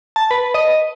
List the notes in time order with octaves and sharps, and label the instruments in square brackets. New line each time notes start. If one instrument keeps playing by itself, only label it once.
[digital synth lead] A5
B4
D#5